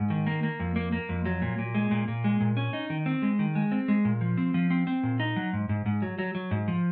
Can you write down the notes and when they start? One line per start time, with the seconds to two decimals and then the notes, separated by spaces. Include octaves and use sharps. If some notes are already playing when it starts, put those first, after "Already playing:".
Already playing: G#2
0.10 D#3
0.27 A#3
0.43 A#3
0.59 F2
0.76 A#3
0.92 A#3
1.09 F2
1.25 F#3
1.42 A#2
1.58 A#2
1.75 G#3
1.91 A#2
2.08 A#2
2.24 G#3
2.41 A#2
2.57 C#4
2.73 D#4
2.90 D#3
3.06 C4
3.22 G#3
3.39 D#3
3.55 G#3
3.72 C4
3.88 G#3
4.05 A#2
4.21 F3
4.37 C4
4.54 F3
4.70 C4
4.87 C4
5.03 A#2
5.20 D#4
5.36 F#3
5.53 G#2
5.69 G#2
5.86 G#2
6.02 F#3
6.19 F#3
6.35 F#3
6.51 G#2
6.68 F3